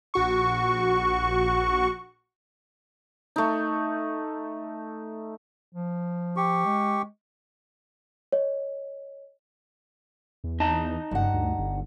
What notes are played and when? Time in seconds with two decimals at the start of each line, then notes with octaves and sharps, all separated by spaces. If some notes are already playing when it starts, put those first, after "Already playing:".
0.14 A#1 F#4 C#6
3.36 A3 D#4
5.74 F3
6.36 G4 C#6
6.66 G#3
8.32 C#5 D#5
10.44 E2
10.60 D#4 D#5 A5
11.11 F#1 G2 F#5
11.33 D2
11.59 G1